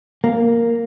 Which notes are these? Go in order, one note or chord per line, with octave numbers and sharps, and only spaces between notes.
A#3